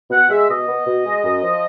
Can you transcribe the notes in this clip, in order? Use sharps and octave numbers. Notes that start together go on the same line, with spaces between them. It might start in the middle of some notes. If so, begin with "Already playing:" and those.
B2 F#5
G#3 E5
B2 D#5
B3
B2
G#3
F#2
F3